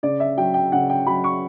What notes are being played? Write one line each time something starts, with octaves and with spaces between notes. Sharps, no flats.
C#3 D5
E5
F#3 G5
G5
C#3 F#5
G5
F#3 B5
C#6